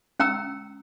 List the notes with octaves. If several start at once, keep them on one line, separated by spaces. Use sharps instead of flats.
C#4 G5 A#5 E6